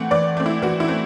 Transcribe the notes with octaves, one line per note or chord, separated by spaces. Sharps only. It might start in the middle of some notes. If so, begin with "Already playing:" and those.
Already playing: E3 A3 C4 F#5
E3 D5
A3 C4
E4
E3 F#4
E4
A3 C4